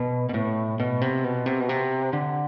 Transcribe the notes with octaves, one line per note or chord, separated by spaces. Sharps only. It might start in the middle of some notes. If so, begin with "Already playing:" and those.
Already playing: B2
B2
A2
B2
C3
B2
C3
B2
C3
D3